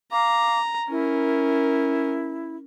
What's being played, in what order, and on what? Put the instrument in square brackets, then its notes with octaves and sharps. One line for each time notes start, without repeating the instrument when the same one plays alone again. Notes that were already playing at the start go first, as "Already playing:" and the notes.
[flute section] F5 D6 [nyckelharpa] A#5
[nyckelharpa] C#4 A#4 [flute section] E4